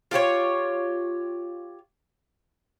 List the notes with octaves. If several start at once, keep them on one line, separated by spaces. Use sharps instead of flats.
F4 G4 C5 C#5